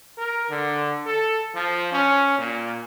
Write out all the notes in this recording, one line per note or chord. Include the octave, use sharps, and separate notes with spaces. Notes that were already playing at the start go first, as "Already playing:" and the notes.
A#4
D3
A4
F3
C#4
A#2